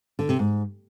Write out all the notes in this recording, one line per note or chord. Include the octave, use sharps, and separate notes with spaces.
D3
C3
G#2